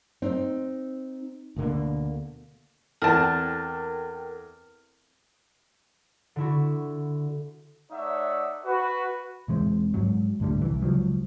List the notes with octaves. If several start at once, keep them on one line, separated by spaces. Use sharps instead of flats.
C4 D#4
D2 B2 D3 A#3
E2 C4 E4 A4 A#4 G5 A5 F6
D3 E4 F#4
A3 D#4 C#5 D5 E5 F#5
F#4 B4
E1 E3 G#3 C4
G#2 F#3
D2 A2 D3 G3
C2 D#3 E3
C#2 F3 F#3